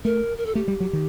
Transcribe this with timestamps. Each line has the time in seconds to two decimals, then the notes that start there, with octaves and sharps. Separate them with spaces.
0.04 A3 A#4
0.38 A#4
0.46 A4
0.55 A3 G4
0.68 G3
0.80 F#3
0.93 D#3